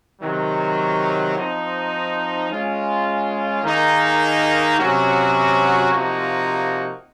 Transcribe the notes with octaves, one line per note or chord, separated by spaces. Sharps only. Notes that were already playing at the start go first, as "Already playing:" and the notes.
C3 D#3 F#3
F3 C4 D#4
G#3 C#4 F4
D#3 A#3 D#4 G#4
C3 F#3 C#4 F#4
C3 F3 A#3 D#4 F#4